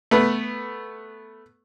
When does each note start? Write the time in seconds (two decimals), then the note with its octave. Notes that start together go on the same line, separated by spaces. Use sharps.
0.11 A3 B3 B4